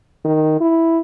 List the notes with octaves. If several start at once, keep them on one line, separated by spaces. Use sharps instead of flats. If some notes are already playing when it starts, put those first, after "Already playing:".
D#3
E4